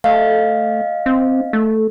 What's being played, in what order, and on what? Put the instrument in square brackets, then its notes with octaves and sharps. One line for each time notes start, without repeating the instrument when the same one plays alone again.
[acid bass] A3 [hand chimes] D#5 F5
[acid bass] C4
A3